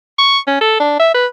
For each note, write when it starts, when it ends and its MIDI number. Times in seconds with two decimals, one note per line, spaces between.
0.18 0.38 85
0.47 0.57 61
0.61 0.77 69
0.80 0.97 62
0.99 1.10 76
1.14 1.26 71